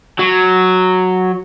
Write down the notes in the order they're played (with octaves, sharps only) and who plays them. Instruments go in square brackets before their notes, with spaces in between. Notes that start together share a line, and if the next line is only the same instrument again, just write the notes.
[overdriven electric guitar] F#3